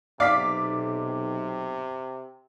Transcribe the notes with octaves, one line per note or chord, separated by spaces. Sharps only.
B1 C3 D5 F5 D6 B6